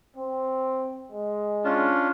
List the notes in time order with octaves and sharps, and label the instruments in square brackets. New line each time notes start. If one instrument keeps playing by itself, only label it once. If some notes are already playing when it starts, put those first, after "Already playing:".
[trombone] C4
G#3
[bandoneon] C#4 D4 F4